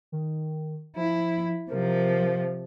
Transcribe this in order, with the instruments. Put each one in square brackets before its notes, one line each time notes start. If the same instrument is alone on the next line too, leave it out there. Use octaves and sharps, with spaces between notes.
[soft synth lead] D#3
[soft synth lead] F3 [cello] E4
[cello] C3 F3 [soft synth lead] A#4